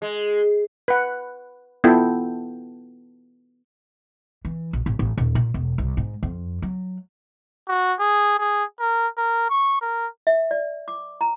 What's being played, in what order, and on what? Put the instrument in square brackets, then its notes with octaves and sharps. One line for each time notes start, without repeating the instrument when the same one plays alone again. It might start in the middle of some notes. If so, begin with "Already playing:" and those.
[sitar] G#3
[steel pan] B4 F#5
B3 E4 F4 A4 G5
[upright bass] E3
A#1
A1
A1
D#1
A#2
E1
C2
G#2
F2
F#3
[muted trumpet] F#4
G#4
G#4
A#4
A#4
C#6
A#4
[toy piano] E5
D5
D6
A#5